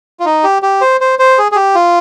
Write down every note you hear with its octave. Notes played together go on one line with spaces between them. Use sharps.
F4
D#4
G4
G4
C5
C5
C5
G#4
G#4
G4
F4